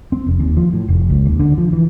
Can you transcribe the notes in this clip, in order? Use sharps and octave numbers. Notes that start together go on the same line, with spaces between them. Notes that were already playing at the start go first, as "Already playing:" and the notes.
C4
F1
D#2
F3
A2
F1
C#2
D#2
D3
F3
E3